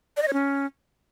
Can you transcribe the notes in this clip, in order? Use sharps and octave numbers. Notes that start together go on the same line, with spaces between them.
D5
D#5
C#5
C#4